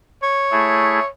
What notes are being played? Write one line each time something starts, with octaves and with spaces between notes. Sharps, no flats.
C#5
A3 E4 G#4